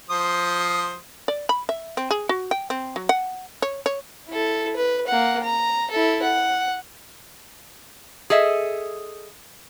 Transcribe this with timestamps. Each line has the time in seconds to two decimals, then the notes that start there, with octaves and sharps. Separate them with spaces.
0.10 F3 C5 D#6
1.28 D5
1.49 B5
1.69 E5
1.97 C4
2.11 G#4
2.29 F#4
2.51 G5
2.70 C4
2.96 F#3
3.09 F#5
3.62 C#5
3.86 C#5
4.29 E4 A4
4.76 B4
5.07 A#3 F#5
5.43 A#5
5.91 E4 A4
6.23 F#5
8.30 G#4 A4 D#5 E5